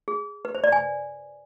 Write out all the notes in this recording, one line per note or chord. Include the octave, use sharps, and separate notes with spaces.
G#4
B4
C5
D5
G#5